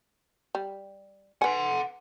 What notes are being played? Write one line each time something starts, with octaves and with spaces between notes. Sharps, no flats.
G3
B4 F#5 G#5 C6